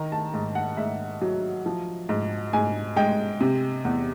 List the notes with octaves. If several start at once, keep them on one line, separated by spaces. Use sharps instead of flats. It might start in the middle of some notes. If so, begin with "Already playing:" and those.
Already playing: D#3 A#5
A5
G#2
F#5
G#2 E5
F#3
F3
G#2
G#2 G#5
G#3 G5
C3
E2